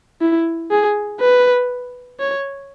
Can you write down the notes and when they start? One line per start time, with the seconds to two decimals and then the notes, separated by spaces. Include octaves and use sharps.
0.21 E4
0.71 G#4
1.20 B4
2.19 C#5